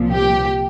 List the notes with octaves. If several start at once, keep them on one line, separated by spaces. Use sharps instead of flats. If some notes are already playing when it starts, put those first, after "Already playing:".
Already playing: C2 A#2 F3
G4